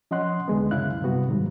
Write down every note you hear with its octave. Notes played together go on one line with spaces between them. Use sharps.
F3 C#4 D#5 F#5 C6 F#6
C#2 D3 G#3 B3
F#2 C#3 C#4 E4 F5 F#6
G2 C3 G3 B3 F#4
G#2 D#3 F#3 G3